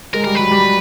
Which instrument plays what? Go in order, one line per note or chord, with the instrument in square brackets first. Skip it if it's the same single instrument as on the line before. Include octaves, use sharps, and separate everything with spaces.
[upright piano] G#3 [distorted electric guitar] A#4
[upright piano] G3 [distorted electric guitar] A#4
[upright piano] F#3 [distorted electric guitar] B4
[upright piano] G3